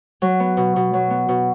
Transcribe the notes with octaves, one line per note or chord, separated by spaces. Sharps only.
F#3
B3
B2
B2
F#3
B3
B2